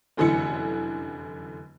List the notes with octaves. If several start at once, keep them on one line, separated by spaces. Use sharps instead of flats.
F1 F#2 D3 E3 E4 C#7